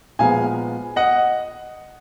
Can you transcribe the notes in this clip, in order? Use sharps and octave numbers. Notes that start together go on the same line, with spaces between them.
A#2 F3 G#3 B3 F5 G#5
D#5 F#5